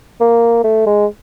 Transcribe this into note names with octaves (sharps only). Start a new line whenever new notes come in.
A#3
A3
G#3